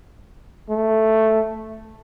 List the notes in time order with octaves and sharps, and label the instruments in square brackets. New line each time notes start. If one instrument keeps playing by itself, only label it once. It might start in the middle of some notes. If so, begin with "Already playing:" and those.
[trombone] A3